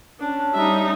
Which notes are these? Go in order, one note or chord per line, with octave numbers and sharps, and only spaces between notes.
C#4 D4
G3 D#4 E5